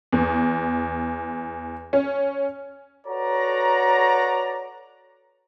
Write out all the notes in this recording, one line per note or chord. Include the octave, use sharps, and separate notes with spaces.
E2
C#4
F#4 A4 B4 C#5 D5 A#5